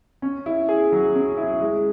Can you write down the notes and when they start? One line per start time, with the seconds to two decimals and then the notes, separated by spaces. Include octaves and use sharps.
0.22 C#4
0.46 E4
0.69 G#4
0.92 F#3
1.15 C#4
1.37 E4
1.61 G#3